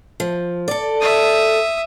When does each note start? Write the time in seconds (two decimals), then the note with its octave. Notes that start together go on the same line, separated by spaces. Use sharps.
0.20 F3
0.68 A4 D5
1.01 E5 D#6